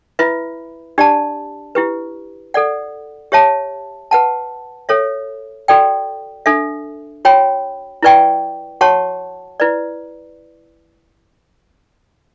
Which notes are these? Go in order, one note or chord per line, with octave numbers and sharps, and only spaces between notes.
E4 B4 E5 B5
D4 G4 D5 A5
E4 G4 B4
A4 D5 F#5
G4 C#5 E5 A5
B4 F#5 A5
A4 C#5 E5
F#4 A4 D5 G5
D4 A4 E5
F#4 C#5 G5 B5
E4 B4 D5 G5 C#6
F#4 C#5 F#5 A5 C#6
E4 B4 D5